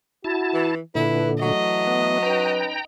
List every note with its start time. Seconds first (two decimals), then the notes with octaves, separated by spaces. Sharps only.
0.24 E4 F#4 A5
0.54 E3
0.95 A#2 D3 E4 A4 B4
1.42 E3 F#3 A3 D#5
1.87 B3
2.23 C#4 D#4 B4 G5 A#5